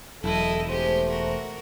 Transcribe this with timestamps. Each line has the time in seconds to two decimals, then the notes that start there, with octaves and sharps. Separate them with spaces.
0.24 E1 F#3 E4 A4 D#5
0.69 G#3 A3 G4 C5
1.08 F#4 A#4